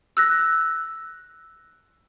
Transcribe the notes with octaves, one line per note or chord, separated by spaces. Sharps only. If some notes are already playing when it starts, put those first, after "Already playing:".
E6 F#6 A#6